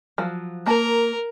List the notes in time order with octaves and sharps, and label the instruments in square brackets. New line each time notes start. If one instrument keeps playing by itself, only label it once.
[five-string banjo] F3 F#3
[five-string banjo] A#3 A5 [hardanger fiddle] A#4